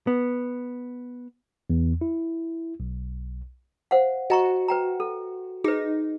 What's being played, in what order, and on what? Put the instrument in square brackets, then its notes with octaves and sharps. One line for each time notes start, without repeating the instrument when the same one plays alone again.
[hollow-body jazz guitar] B3
[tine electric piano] E2
E4
B1
[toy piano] C5 F5 F#5
[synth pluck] F#4 [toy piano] D#5 A#5 C#6
[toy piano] B4 G5 A#5
A4
[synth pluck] D#4 [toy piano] G#4 B4